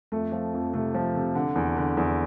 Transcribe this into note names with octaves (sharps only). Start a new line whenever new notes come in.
F2 A3
F3
F2
C3 A3
F3
C3
D3
E2
D3
E2